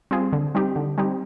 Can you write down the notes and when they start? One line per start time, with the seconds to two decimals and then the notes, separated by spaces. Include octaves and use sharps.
0.11 G3 C4 F4 G#4
0.33 D3
0.55 G3 C4 D#4 G4
0.76 D3
0.98 G3 C4 D#4 G4